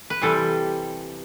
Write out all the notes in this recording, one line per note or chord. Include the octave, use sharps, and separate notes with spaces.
B4
C3 E3 G3 A4